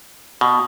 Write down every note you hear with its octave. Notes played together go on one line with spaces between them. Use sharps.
B2